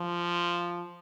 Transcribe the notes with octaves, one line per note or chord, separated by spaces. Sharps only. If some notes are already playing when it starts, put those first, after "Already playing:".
Already playing: F3